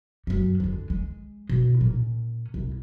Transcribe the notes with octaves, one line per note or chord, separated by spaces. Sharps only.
F#2 G3
D3 G#3
G#3
B2
A#2 C#4
C2